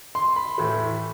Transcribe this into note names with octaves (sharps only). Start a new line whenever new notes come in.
C6
B5
A2 E3 A3